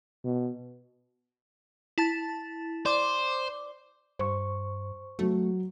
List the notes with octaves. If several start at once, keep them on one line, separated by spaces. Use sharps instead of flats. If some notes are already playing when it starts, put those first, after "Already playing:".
B2
E4 A5 A6
C5 D5 D6
G2 C5 C#6
F#3 A3 F#4